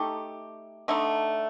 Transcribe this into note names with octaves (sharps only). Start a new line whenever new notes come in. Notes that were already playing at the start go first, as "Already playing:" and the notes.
Already playing: A3 D#4 G4
D3 A3 D#4